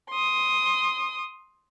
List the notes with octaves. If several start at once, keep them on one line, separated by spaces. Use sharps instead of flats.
C6 D#6